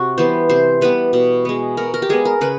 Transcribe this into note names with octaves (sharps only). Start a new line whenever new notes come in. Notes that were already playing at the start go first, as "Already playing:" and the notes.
Already playing: C3 F#4
E3 G3 B3 C5
C3 C5
E3 G3 B3 B4
B2
G#3 B3
B2 A#4
A#4
G4
G#3 B3 G#4
A#4
C#3 B4